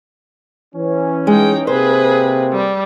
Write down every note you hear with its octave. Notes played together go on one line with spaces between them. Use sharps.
E3 C#4
G#3 D#4 G5
C3 A#3 C4 G#4 B4 C5
G3